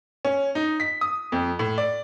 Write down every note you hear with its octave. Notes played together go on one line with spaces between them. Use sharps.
C#4
D#4
B6
D#6
F2
A2
D5